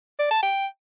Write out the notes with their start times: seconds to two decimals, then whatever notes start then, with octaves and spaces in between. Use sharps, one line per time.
0.19 D5
0.31 A5
0.43 G5